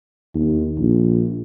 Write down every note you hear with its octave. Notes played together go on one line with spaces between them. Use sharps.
D#2
A#1